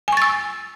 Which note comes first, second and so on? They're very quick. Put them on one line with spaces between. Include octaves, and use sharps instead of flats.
G#5 C#6 A6 E6